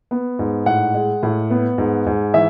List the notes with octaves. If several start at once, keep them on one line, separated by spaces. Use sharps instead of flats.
B3
G#2
A2 F#5
G#3
A2
B3
G#2
G#2
E3 E5